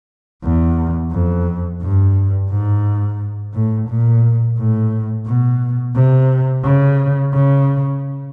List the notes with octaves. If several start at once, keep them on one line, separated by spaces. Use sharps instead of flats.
E2
F2
G2
G#2
A2
A#2
A2
B2
C3
C#3
C#3